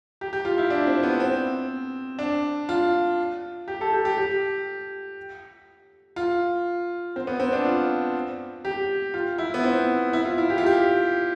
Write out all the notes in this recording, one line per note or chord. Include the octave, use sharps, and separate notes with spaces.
G4
G4
F4
E4
D4
C4
B3
C4
D4
F4
G4
A4
G4
G4
G4
F4
C4
B3
C4
D4
F4
G4
F4
E4
B3
C4
E4
F4
E4
G4
F4
G4